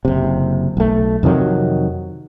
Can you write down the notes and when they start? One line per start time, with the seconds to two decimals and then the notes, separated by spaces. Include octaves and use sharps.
0.05 F#1 C3
0.77 B1 A3
1.23 F2 C3 D#3 F#3